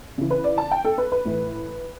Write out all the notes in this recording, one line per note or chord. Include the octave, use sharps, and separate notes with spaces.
C#3 E3
B4
D5
A5
G5
A4
B4
B4
A2 E3